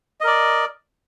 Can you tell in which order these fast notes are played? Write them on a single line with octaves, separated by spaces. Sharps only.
D#5 A#4 D5